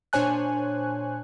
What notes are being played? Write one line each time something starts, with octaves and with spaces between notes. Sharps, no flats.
A#2 D4 C5 C#5 G#5 F#6